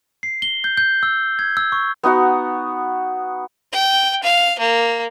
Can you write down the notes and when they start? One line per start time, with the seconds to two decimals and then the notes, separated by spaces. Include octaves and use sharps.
0.23 C7
0.42 G7
0.64 G6
0.77 G6
1.03 E6
1.39 G#6
1.57 E6
1.72 C#6
2.03 B3 D#4 F#4 F#5
3.72 G5
4.23 F5
4.59 A#3